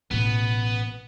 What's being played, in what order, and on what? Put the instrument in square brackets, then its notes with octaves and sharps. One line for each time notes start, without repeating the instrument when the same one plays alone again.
[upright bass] A1 B2 [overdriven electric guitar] B3